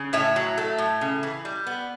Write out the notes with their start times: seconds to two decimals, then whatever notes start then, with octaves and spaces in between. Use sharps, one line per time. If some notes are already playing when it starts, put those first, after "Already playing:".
Already playing: C#3
0.13 A2 C#5 E5
0.36 F#3
0.58 A3
0.78 A2
1.01 C#3
1.23 E3
1.45 G3
1.67 B3